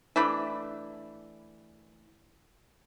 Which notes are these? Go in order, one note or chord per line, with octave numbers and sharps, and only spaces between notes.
E3 A3 D4 B5